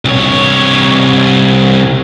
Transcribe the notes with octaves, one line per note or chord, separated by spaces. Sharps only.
C2 C#5